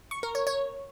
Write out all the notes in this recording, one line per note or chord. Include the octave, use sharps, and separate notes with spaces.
C#6
A#4
C#5
C#5